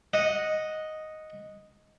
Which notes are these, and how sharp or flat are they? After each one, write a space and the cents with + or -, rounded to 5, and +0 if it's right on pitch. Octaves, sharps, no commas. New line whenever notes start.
D#5 +0 F#5 -10